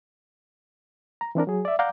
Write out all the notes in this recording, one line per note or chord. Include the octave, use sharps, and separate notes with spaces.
A#5
E3 C4 D4 A#4
F#3 G#4
D5 E5
D5 F5 F#5 A#5 D6 G6